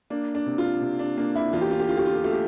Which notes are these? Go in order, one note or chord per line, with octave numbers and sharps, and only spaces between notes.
A#3 D4
D4
C3
F4
C3
D4
A#3 D4
E4
E2 F4
G4
F4
G4
D3 F4
G4
F4
G4
A3 F4
G4